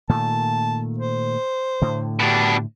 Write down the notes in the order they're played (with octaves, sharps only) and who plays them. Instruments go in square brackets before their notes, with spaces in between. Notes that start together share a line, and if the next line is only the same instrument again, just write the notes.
[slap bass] A#2 D#3 A3 [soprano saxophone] A5
[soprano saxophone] C5
[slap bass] A2 D3
[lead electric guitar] B2 D4 [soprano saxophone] G4